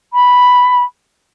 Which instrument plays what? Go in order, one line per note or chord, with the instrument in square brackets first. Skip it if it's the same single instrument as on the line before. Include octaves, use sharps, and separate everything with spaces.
[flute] B5